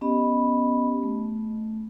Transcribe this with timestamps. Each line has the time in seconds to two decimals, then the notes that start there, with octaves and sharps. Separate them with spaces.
0.01 B3 C#4 G4 D#5 B5
1.03 A3